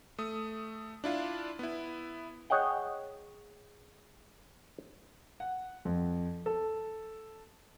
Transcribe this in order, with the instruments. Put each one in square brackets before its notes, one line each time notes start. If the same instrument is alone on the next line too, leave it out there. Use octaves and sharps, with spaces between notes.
[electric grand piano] A3 D#6
D4 E4 F4
B3 E4
[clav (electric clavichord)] G#4 C#5 D#5 F#5 G5
[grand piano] F#5
F2
A4